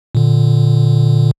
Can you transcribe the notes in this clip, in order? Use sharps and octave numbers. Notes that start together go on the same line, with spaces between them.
A#2 D3